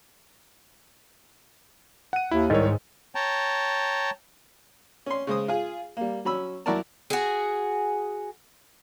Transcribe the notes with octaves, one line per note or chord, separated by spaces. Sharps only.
F#5 D#7
D#2 E4
C2 G#2 D#3 A#4 C#5 D#5
C#5 G5 A5 A#5
C#4 C6
C#3 G#3 C5 D#6
F4 G#4
G3 A#3
F#3 C#4 B5 E6
F#2 E4 F#4 A#4 D5 A5
F#4 G#4